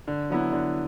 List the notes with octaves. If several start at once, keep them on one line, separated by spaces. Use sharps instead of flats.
D3
F#3 B3 E4
D3